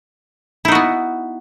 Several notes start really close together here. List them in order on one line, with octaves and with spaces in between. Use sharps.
E4 D#4 F#4 B3